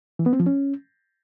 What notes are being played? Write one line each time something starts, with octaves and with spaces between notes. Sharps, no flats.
E3
B3
C4
F3
C#4